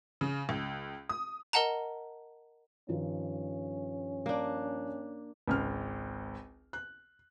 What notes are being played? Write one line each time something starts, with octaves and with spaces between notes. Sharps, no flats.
C#3
C#2
D#6
A#4 D#5 F#5 A5 A#5
G2 D#3 F3 C#4
A#3 D4
G#1 C#2 F6
F#6